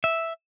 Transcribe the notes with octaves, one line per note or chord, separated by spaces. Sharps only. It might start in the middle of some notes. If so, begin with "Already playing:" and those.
E5